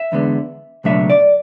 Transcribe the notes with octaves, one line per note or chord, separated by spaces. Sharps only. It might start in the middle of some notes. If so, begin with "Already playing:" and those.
Already playing: E5
E2 D3 G#3 B3
C#2 B2 F#3 A3 D4 E5
D5